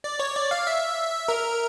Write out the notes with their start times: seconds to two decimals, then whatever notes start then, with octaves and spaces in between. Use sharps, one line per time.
0.04 D5
0.20 C#5
0.36 D5
0.51 F5
0.67 E5
1.28 A#4